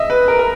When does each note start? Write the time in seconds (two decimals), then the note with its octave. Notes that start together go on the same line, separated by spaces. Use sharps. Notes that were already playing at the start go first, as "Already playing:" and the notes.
Already playing: D#5 E5
0.10 B4
0.28 A#4
0.39 A#4